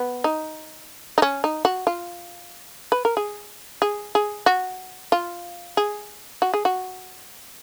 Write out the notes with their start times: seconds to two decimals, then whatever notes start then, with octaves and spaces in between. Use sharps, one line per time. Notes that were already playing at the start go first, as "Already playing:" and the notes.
Already playing: B3
0.24 D#4
1.18 D#4
1.22 C#4
1.44 D#4
1.65 F#4
1.87 F4
2.92 B4
3.05 A#4
3.17 G#4
3.82 G#4
4.15 G#4
4.46 F#4
5.12 F4
5.77 G#4
6.42 F#4
6.54 G#4
6.65 F#4